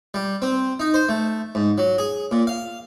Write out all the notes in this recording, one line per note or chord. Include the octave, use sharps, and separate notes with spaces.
G3
C4
D#4
C5
A3
G#2
F#3
G#4
A#2
F5